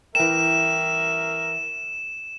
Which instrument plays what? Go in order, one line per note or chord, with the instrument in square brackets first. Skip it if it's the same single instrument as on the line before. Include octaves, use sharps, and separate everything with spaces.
[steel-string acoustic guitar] E3 G5 [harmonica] A#4 E5 [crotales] E7